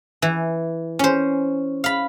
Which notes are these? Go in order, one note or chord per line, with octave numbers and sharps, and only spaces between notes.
E3
C#4 C5
F5 B5